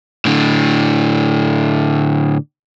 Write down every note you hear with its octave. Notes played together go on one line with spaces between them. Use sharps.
A2 D3